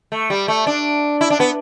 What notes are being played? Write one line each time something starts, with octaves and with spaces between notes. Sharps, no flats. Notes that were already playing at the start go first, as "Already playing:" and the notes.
A3
G3
A3
D4
E4
D4
B3